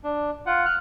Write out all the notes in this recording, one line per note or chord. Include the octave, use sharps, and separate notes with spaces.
D4
F4 F#5
F6 F#6